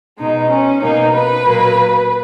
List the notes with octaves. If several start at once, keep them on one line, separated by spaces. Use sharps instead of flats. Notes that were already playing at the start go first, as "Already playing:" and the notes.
B2 G#3 D#4
C#4
B2 A#3 D#4
B4
A#2 F#3 A#3